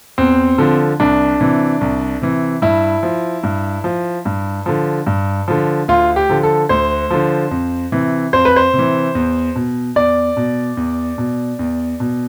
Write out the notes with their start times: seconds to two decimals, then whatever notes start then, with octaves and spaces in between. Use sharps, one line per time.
0.18 E2 C4
0.58 D3 F3
1.00 C2 D4
1.41 C3 E3
1.81 C2
2.22 C3 E3
2.62 G2 E4
3.03 F3
3.43 G2
3.84 F3
4.25 G2
4.66 D3 F3
5.07 G2
5.48 D3 F3
5.88 D2 F4
6.16 G4
6.29 D3 F3
6.43 A4
6.69 D2 C5
7.11 D3 F3
7.51 F2
7.92 C3 E3
8.33 F2 C5
8.45 B4
8.56 C5
8.73 C3
8.79 E3
9.15 E2
9.55 B2
9.96 E2 D5
10.37 B2
10.77 E2
11.18 B2
11.59 E2
12.00 B2